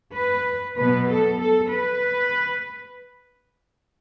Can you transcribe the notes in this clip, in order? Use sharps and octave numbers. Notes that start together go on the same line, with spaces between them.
B4
B2 F#3 B3 B4
A4
A4
B4